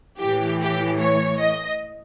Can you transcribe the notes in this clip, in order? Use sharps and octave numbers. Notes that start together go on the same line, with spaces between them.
A2 E3 G4
G4
C#5
D#5